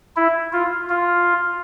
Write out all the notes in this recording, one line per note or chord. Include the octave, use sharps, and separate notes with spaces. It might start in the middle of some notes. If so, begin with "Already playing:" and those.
E4
F4
F4